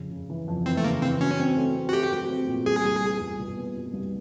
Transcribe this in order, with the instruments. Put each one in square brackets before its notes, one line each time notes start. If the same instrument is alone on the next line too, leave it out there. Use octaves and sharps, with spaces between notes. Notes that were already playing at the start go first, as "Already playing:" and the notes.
Already playing: [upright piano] F2 C#3
C#3
E3
F2
[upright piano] E3 [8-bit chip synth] C4
[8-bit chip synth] A3
[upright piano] C#3 [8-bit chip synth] A#3
[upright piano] E3 [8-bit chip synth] C4
[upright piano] F#3 [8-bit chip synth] C#4
[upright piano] C4
A3
C4
[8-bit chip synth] F#4
[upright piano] A3 [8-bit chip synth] G4
[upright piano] F#3
C4
A#2
[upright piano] C2 [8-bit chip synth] G#4
[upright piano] C2
B3
C2
B2
B3
B2
C2